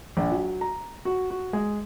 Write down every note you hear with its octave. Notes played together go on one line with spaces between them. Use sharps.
A#1
F#3
A#5
F#4
F#4
G#3